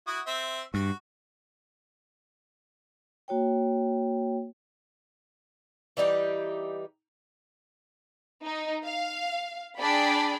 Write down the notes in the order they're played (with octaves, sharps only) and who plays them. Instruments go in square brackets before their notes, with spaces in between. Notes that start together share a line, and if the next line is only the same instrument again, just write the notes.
[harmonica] E4 F#4 D#6
C4 E5
[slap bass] G2 [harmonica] F#4
[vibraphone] A#3 F#4 C#5 G5
[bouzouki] E3 G3 D#4 G4
[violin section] D#4
F5
D4 G#4 D5 G5 B5